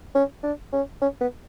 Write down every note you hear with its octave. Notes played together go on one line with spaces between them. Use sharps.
C#4
D4
C#4
C#4
B3